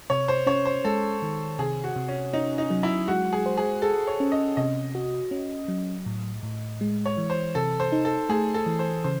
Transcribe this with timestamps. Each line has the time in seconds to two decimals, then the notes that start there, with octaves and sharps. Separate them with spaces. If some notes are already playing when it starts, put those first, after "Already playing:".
0.10 C3 C#5
0.28 C5
0.47 C#4 C#5
0.66 C5
0.85 G#3 A4
1.22 D#3
1.59 C3 G#4
1.84 F#4
1.96 C3
2.09 C#4
2.33 C#4 D#4
2.58 D#4
2.70 F#3
2.83 E4
3.08 G#3 F#4
3.33 G#4
3.46 C5
3.57 G#4
3.82 G#4 A4
4.07 C#5
4.20 C#4
4.32 D#5
4.57 C3 D#5
4.95 F#4
5.31 C#4
5.68 F#3
6.06 A2
6.43 A2
6.81 G#3
7.06 C#5
7.18 E3
7.30 C5
7.55 C3 A4
7.80 C5
7.92 D#4
8.05 A4
8.29 A3 G#4
8.54 A4
8.66 E3
8.79 C5
9.04 C#3 C5